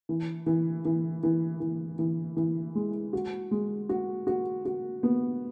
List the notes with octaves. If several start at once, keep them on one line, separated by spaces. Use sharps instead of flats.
E3
E3
E3
E3
E3
E3
E3
G#3
F#4
G#3
F#4
F#4
F#4
B3